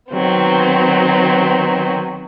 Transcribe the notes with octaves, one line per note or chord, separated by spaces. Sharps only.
D#3 F#3 B3 C4